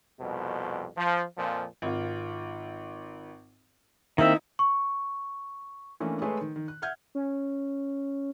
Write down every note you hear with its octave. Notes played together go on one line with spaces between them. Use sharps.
C2 F2 B2
F3
F2 A#2 F3
G#1 F4
D#3 A#3 C4 D#4 E4 E5
C#6
E3 A3 A#3 C#4 D4
G#3 A3 G#4 B4 C#5
D#3
D#3
F#6
E5 F#5 F6 G6 G#6
C#4